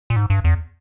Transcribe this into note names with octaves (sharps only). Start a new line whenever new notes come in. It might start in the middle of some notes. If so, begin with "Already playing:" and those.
A#2
G#2
G2
E2